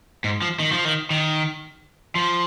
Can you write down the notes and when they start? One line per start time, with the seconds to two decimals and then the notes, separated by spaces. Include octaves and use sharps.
0.24 G#2
0.42 F3
0.60 D#3
0.72 F3
0.85 D#3
1.10 D#3
2.15 F3